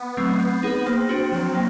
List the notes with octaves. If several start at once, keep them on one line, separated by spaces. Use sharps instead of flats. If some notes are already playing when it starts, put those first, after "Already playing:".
Already playing: B3
F#3 A3 C4
B3 C4
D#4 G#4 B4
A#3 C4
D4 F#4
F3 F#3
A#3